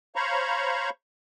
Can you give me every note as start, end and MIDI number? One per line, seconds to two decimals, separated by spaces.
0.16 0.90 72
0.16 0.90 73
0.16 0.90 77
0.16 0.90 82
0.16 0.90 83
0.16 0.90 85